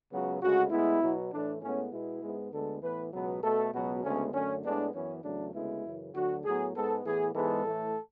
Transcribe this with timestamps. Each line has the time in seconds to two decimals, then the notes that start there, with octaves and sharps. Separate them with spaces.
0.11 C#2 C#3 F#3 B3 F#4
0.41 D2 C#3 G#3 F#4
0.71 A2 G#3 B3 E4
1.02 B2 F#3 B3
1.32 A2 E3 A3 D4
1.62 A2 G#3 B3 C#4
1.92 B2 G#3 B3 E4
2.23 G#2 G#3 B3
2.53 D2 D3 G#3 B3 A4
2.83 A2 E3 B3 B4
3.13 C#2 B2 F#3 B3
3.43 B2 A3 A4
3.73 C#2 B2 F#3 B3 F#4
4.03 D2 C#3 G#3 B3 C#4
4.33 F#2 D3 A3 C#4
4.64 A2 G#3 B3 D4
4.94 F#2 E3 B3 C#4
5.24 E2 C#3 F#3 A3 D4
5.54 D2 C#3 G#3 B3 E4
5.85 F#2 C#3 E3
6.14 D2 D3 F#3 F#4
6.44 A2 F#3 B3 G#4
6.76 G#2 G#3 B3 A4
7.05 A2 E3 B3 G#4
7.35 G#2 E3 G#3 B3 A4
7.65 A2 E3 A3